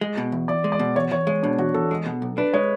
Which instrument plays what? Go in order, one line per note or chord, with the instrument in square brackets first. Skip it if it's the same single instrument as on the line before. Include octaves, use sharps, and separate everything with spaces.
[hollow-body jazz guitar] G#3
B2
E2
[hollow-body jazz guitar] E2 [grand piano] D5
[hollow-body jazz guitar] G#3
[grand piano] D5
[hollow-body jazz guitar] B2
[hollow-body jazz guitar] E2 [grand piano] C#5
[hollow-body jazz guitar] E2 [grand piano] C#5
[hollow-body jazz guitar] G#3 [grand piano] C#5
[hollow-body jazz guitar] B2 [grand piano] D4
[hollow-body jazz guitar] E2 [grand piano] F#4
[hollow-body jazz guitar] E2 [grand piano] A4
[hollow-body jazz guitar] G#3
B2
B1
[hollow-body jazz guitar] D4 [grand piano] B4
[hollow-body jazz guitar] G#3 [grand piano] C#5